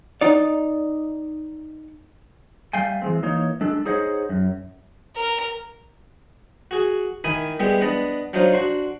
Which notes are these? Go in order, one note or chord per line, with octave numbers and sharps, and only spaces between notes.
D#4 D5
G3 A3 F5 G5 G#5
E3 G#3 C4
E3 A#3 D#4 C#5
G#3 D4 A4
D#4 G#4 C5 C#5 D#5 F#5
F#2
A#4
F#4 G#4
D#3 E4 G#5 B5 D#6
G3 G#3 B3 E4 G4
B3 D4 D#5 A5 B5
F#3 D4 D#4 F4 C5
D4 F#4 C6